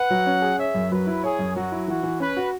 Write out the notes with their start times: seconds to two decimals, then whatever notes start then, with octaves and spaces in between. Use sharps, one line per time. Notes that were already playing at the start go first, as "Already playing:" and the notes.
Already playing: B4 F#5
0.10 F#3
0.26 C#4
0.42 G#4
0.59 C#5 E5
0.74 F#2
0.91 F#3 B4
1.07 E4
1.24 G#4 C#5
1.39 F#2
1.55 F#3 F#4
1.72 E4
1.88 E3 F#4
2.03 E3
2.20 C#4 B4
2.37 F#4